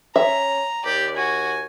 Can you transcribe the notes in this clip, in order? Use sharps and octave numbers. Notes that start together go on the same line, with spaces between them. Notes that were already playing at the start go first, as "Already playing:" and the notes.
C#4 E5 A#5
D#2 G4 D5
F#4 G#5